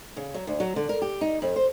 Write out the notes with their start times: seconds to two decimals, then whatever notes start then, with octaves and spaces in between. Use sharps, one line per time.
0.16 C#3
0.34 F#3
0.47 D2
0.60 F#3
0.76 D3
0.89 A#4
1.02 G4
1.21 D#4
1.42 F2
1.56 C5